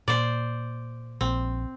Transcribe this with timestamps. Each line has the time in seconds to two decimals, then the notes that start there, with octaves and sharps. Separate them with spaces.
0.08 A#2 C5 D5
1.21 A#1 C4